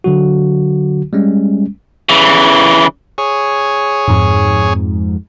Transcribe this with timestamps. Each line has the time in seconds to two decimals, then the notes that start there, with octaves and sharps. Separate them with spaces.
0.04 D3 F#3 F#4
1.13 G3 G#3 C#4
2.09 C#3 E3
3.18 G#4 C#5
4.08 F2 G#2